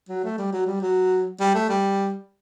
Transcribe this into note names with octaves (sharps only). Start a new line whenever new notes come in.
F#3
A3
G3
F#3
G3
F#3
G3
A3
G3